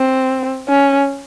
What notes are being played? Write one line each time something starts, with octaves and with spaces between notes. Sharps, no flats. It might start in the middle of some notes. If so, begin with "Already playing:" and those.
Already playing: C4
C#4